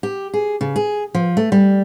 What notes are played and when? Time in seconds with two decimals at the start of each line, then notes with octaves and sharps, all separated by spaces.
0.03 G4
0.34 G#4
0.61 C#3
0.76 G#4
1.15 F3
1.37 A3
1.52 G3